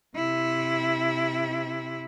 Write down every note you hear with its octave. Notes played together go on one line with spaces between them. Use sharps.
C3 E4